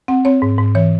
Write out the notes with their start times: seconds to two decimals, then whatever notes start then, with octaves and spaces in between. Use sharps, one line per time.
0.08 C4 F#5
0.25 C4 C#5
0.42 G#2
0.58 G#2
0.75 E3 C#5